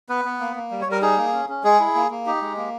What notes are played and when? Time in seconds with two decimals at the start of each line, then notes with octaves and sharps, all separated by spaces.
0.09 B3 B4
0.25 B3
0.40 A#3
0.55 A#3
0.71 G3
0.81 C#5
0.86 G3
0.91 A#4
1.02 D#4 G#4
1.17 A#3
1.33 C#4
1.49 C#4
1.64 G#3 G#4
1.80 E4
1.95 A#3
2.10 A#3
2.26 D#4 G4
2.41 G#3
2.57 A#3